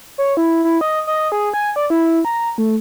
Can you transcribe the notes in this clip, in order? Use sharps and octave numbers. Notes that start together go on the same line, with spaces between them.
C#5
E4
E4
D#5
D#5
G#4
G#5
D5
E4
A#5
A3